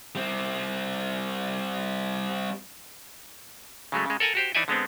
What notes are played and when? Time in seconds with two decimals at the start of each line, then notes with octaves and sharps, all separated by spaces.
0.15 G3 C4
3.92 C#3 F#3 G#3 A3
4.06 C#3 G#3
4.20 A4 A#4 F#5 G#5 A#5
4.35 F#4 G4 C5
4.55 E3 D#4 D5 E5 G#5
4.68 D3 G#3 B3 C4